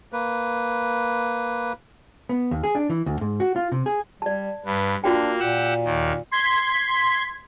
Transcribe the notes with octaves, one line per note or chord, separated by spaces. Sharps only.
A#3 B4
B3
D#2
G#4
D4
E3
D2
G#2
F#4
F4
C3
G#4
G3 D5 A5
G2 B4
A#3 D4 F4 F#4 G5
A#2 G4 F#5 E6
D#2 D#3
C6 G#6 B6